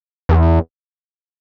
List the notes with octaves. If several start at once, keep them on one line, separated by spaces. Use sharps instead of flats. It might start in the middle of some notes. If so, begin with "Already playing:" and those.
E2